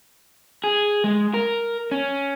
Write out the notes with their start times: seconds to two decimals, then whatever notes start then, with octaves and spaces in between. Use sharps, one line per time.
0.64 G#4
1.04 G#3
1.34 A#4
1.91 C#4